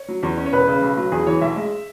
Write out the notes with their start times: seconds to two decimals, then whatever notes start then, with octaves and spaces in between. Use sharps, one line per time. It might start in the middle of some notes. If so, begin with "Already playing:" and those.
Already playing: C#5
0.08 F#3
0.23 E2
0.37 C#4
0.46 C#5
0.52 E1 B4
0.67 C#3
0.82 B1
0.97 F#3
1.12 E2 G#4
1.27 E3 C#5
1.41 B1 E5
1.56 G#3